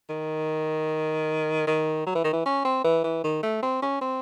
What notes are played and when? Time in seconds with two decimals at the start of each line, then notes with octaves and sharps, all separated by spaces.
0.10 D#3
1.67 D#3
2.06 F#3
2.15 E3
2.24 D#3
2.33 E3
2.46 C#4
2.65 C4
2.84 E3
3.04 E3
3.24 D#3
3.43 A3
3.63 C4
3.82 C#4
4.01 C4